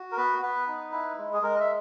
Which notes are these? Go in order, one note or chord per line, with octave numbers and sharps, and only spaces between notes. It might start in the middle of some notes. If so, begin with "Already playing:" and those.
Already playing: F#4
A#4
B3 B4
B3 B4
D#4
E4
G#3
G#4
G#3 A#4
D#5
E5